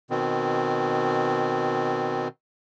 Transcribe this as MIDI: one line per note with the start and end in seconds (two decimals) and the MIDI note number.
0.10 2.28 47
0.10 2.28 51
0.10 2.28 60